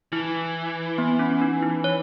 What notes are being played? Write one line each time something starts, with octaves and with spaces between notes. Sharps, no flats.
E3 E4
B3
C#4
D#4
E4
C#5